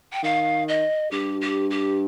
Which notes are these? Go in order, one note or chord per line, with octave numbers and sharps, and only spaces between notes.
G5
D#3 F5
D#5
G2 G4
G4
G4